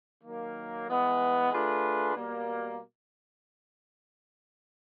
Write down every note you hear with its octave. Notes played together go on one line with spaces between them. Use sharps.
D#3 F#3 A#3
E3 G#3 B3
A3 D4 F4 G#4 B4
B2 G3 A#3